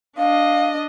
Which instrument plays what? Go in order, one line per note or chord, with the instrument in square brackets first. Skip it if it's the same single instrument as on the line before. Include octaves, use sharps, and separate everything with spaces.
[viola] D4 D#5 [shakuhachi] F5